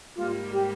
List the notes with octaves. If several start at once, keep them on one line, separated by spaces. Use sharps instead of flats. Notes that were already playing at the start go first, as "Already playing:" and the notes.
G#2 G3 A#3 F4
G4